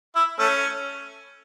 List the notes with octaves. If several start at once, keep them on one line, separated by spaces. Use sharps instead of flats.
E4
A3 C#4